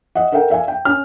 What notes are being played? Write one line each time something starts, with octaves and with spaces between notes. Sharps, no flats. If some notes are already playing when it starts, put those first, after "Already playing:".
D#5 E5 F#5
A4 A#4 E5 F#5 G5
D5 E5 F5 G#5
G5
C#4 F6